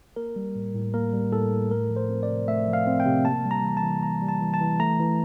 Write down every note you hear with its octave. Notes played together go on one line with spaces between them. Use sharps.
A#3 A#4
G3
A2
A2
A#3 A#4
G3
A2 A4
A2
A3 A#4
F3
C5
C4
D5
C3
A3 E5
F3
F5
C4
G5
C3
A#3 A5
G3
A#5
E3
A5
E3
A#3 A#5
G3
A5
E3
A5
E3
A3 A#5
E3